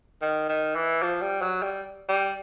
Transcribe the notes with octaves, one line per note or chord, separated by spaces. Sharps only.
D#3
D#3
E3
F3
G3
F#3
G3
G3